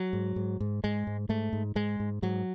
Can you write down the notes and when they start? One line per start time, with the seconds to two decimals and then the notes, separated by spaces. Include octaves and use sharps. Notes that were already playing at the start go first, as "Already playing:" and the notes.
Already playing: F#3
0.13 G#2
0.36 G#2
0.60 G#2
0.84 G#2 G#3
1.07 G#2
1.29 G#2 A3
1.53 G#2
1.75 G#2 G#3
2.00 G#2
2.22 G#2 F#3